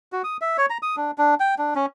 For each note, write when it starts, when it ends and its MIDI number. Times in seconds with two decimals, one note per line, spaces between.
0.13 0.22 66
0.24 0.37 87
0.41 0.57 76
0.58 0.66 73
0.70 0.78 82
0.83 0.96 87
0.97 1.11 62
1.18 1.35 62
1.40 1.55 79
1.58 1.74 62
1.75 1.86 61